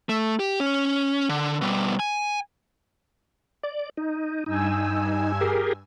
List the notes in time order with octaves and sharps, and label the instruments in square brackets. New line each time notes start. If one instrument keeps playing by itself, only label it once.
[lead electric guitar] A3
G4
C#4
D3
B2 G3
G#5
[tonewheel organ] D5
D#4
[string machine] G2 G#5 E6 [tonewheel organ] D#4
[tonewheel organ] G4 G#4 A#4